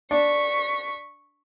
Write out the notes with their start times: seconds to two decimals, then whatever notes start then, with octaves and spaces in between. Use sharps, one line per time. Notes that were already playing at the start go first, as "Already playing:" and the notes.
0.11 D4 C#6 B6